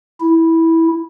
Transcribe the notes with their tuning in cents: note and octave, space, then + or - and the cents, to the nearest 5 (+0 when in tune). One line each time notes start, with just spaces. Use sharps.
E4 -10